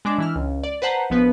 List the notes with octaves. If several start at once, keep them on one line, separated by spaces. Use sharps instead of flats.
G#3 D4 D6
E3 E4 F6
C#2
D5
B4 C5 F#5 A5 A#5
A#1 F3 B3 B4